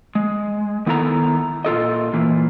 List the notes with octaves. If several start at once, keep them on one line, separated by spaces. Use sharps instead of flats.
G#3
D#3 B3 E4 A4 F#5 A#5
A#2 F4 A4 D#5
A#2 E3 A#3